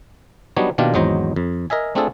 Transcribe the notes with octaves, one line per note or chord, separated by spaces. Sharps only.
F#3 G3 B3 D4 D#4 C#5
B2 D#3 A#3 D4 F4 G4
G#1 E2 F#3 D#4 C5 A#5
F2
A#4 D#5 E5 G#5
A3 C4 D4 F4 G#4 A4